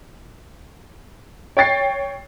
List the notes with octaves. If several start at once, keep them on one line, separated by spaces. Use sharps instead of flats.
C#5 G5 A6 C7